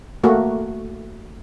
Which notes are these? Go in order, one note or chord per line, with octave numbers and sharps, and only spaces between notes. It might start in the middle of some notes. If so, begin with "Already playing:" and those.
A3 A#3 F#4